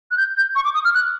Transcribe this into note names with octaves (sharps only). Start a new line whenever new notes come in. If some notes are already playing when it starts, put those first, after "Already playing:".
F#6
G6
G6
C#6
D6
D#6
F6
F#6